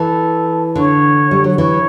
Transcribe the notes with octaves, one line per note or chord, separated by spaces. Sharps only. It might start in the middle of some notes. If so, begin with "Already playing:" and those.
Already playing: E3 A4
D3 C#5
G3
F#3
E3 C#5